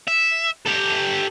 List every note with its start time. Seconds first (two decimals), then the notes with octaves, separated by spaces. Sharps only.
0.08 E5
0.66 G4 A4